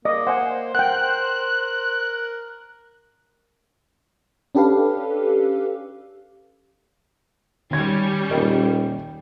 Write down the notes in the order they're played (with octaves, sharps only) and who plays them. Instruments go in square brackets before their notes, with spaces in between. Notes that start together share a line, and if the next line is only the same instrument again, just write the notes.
[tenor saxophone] A#3 [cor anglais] D5 [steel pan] D#5
[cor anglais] C5 [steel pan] F#5 G#5
[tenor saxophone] A#4 [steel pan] F#5 G5 [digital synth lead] F#6
[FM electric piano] C#4 D4 G4 A4 B4 F5
[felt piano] D#3 G#6 [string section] G3 C#4
[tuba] D#1 [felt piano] A#4 D#5 G5